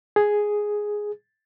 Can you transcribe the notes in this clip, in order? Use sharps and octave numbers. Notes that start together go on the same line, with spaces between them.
G#4